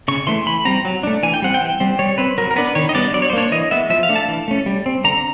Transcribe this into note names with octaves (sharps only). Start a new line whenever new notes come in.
C#3 C#6
E3 A3 C6
E3 B5
G3 C4 A#5
F#3
A3 D4
E3 G#5
G5
G3 C4 F#5
G5
E3
G3 C4
G3 C#5
C4 B4
F#3 A#4
A#4
B3 D4 B4
D#3 C#5
D#5
G3 B3 D4 D5
F#3 D5
C#5
C5
A#3 D4 C#5
E3 D#5
G#3 B3 E5
F3 E5
F5
A3 D4
A5
E3
A3 C#4
G3
C4
D3 A#5